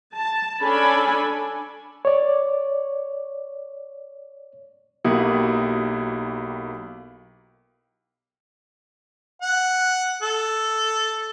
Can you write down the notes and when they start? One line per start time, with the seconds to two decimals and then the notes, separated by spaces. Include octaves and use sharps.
0.14 A5
0.61 C#4 D4 A4 G#5 B5
2.05 C#5 D5
5.05 B1 A#3 E4 F#4 G4 D#6
9.42 F#5
10.22 A4